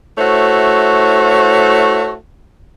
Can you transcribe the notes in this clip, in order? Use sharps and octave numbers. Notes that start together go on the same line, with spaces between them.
A3 E4 F#4 C5 C#5